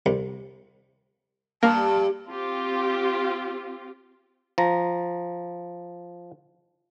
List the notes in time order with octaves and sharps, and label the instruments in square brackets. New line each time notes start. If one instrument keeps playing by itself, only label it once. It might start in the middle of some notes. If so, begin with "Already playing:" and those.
[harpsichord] C2
[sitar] G2 [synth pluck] A#3 [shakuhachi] A5
[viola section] C4 F4 G4
[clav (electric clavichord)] F3 A#5